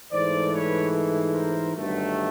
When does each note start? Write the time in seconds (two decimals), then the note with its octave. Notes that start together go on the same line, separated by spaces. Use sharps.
0.12 G#2 E3 A3 C5 D5
0.52 B4 C#5
1.33 A#4 C5
1.75 G1 G2 D#3 F#3 A3